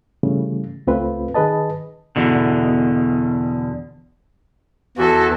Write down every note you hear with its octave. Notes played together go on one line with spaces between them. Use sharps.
C#3 E3 G3 A3
C#2 A3 C4 F4 B4
D#3 G#4 B4 D#5 A5
E2 B2 D3
E2 E3 F#4 A4